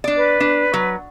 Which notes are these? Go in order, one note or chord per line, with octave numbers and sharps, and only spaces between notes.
D4 D5
B4
D4
F#3